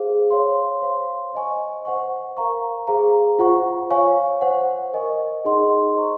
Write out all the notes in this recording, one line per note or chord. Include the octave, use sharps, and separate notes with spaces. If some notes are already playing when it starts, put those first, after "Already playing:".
Already playing: G#4 C5 F5
C#5 F5 C6
C5 F5 C6
C5 D#5 G#5 C#6
C5 F#5 C#6
A#4 F5 A#5 C#6
G#4 C5 F5 A#5
F4 C5 F#5 C#6
C#5 F5 G#5 C#6
C5 F#5 C#6
A#4 D#5 G#5 C#6
D#4 G#4 D#5 F#5 C6
C5 D#5 A#5 C#6